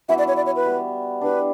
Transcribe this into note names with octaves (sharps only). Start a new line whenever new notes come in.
E3 B3 F#4 E5
D5
C#5
D5
C#5
B4
G3 B3 F#4
E3 G3 D4 B4